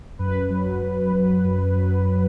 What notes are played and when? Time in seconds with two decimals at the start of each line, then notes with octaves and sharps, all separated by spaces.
0.19 F#2 B4
0.50 F#3
0.82 F#2
1.12 F#3
1.44 F#2
1.76 F#3